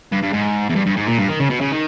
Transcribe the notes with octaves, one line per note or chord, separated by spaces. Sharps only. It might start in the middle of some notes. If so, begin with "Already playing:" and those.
G2
G2
G#2
E2
G2
G2
G#2
A#2
G2
D#3
C#3
B2
C#3
D#3